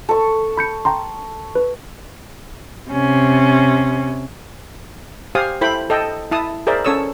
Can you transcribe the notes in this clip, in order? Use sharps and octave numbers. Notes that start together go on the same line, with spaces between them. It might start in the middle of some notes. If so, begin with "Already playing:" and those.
A4 C#6
B5 G6 C#7
G5 A#5 C6
B4
C3 C#4
G4 C5 F5 G#5 D#6
E4 A4 C5 G5 B5
A4 D#5 G5
E4 A5 D#6
G#4 A#4 C5 D5 E5
C#4 A4 C#5 D#6 E6